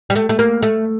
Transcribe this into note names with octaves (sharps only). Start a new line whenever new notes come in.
G3
A3
A3
A#3
A3